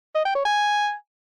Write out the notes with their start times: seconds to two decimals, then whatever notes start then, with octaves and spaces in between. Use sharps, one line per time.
0.15 D#5
0.25 G5
0.35 C#5
0.45 G#5